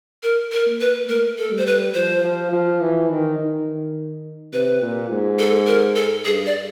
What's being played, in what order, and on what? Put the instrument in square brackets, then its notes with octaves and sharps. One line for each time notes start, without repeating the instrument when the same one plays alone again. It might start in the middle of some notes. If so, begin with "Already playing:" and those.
[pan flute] A#4
A#4
[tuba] A#3
[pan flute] B4
[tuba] A3 [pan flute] A#4
[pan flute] A4
[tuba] G3
[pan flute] C5
B4
[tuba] F3 [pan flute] C5
[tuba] F3
F3
E3
D#3
D#3
[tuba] C3 [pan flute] B4
[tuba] A#2
G#2
[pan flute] A4
A#4
A4
[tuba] G2 [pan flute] G#4
[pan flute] D5